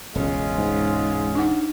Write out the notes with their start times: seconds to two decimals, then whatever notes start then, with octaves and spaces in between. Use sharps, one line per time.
0.15 E1 C#2 G#3 C#4 F4
0.58 G#2
1.35 D4 D#4 F#5